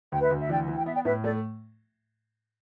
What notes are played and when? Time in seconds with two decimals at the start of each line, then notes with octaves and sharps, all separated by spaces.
0.12 D2 G5
0.21 B4 E5
0.31 D2
0.39 E5
0.49 E3 D5 G5
0.68 E3
0.77 G5
0.85 B3 E5
0.94 D5 G5
1.05 A2 B4 E5
1.23 A3 A4 D5